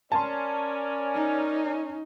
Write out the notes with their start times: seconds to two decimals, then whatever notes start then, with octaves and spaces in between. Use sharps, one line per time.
0.12 C#4 A#4 D5 A5 C6
1.15 D#4